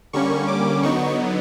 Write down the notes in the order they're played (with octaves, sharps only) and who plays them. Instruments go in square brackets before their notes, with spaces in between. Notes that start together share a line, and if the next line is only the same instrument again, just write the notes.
[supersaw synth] D3 G3 A#3 C#4 C#6
D6
D3 F#3 B3 D#4 C#6